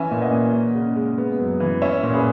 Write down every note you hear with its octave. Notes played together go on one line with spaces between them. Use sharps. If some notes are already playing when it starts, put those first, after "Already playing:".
Already playing: E3 C#4 E5 G#5
A#2 E5
D#5 F#5
A#3
C#4
C#3
G#3
B3
F#2
E3
C#4 C#5 E5
A#2
G#4 B4